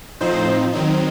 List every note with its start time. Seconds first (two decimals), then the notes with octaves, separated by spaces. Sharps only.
0.21 A2 F3 C4 D#4 C5
0.73 D#3 F#3 C4 D#4